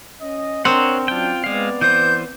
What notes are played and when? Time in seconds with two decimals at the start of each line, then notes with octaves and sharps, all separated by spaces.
0.21 C#4 D#5
0.65 C4 D4 A#4 C5 C#5 F#5
1.08 F#3 C#4 D4 F4 G5
1.44 G#3 B3 B4 D5 F5
1.81 E3 C5 G6